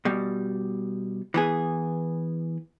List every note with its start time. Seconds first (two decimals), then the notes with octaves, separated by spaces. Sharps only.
0.05 B2 G3
1.34 E3 B3 G#4